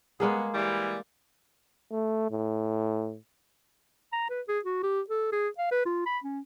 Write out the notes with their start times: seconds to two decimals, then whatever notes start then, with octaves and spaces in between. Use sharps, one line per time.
0.20 G#3 A#3 B3 G#4
0.54 E3 G3
1.91 A3
2.31 A2
4.13 A#5
4.30 B4
4.48 G#4
4.65 F#4
4.83 G4
5.10 A4
5.32 G#4
5.58 F5
5.71 B4
5.86 F4
6.06 B5
6.24 C#4